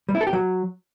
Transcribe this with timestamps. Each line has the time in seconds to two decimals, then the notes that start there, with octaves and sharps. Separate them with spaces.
0.09 G3
0.15 E4
0.21 A4
0.27 G4
0.33 F#3